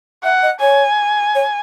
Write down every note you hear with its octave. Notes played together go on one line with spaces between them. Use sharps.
E5 F#5
D#5
C#5 G#5
C#5